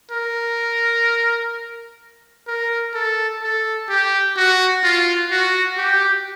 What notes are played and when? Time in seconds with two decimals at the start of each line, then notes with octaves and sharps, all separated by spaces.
0.11 A#4
2.47 A#4
2.94 A4
3.42 A4
3.89 G4
4.37 F#4
4.83 F4
5.31 F#4
5.77 G4